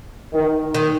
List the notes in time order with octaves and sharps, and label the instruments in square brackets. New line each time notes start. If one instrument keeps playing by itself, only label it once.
[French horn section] D#3
[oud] D#3